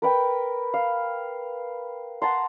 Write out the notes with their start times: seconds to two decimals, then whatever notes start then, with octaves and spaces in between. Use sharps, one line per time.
0.02 A#4 B4 G5
0.74 F5
2.22 F#5 A5 A#5 C6